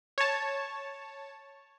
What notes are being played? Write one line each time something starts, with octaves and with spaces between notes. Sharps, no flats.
C#5 A5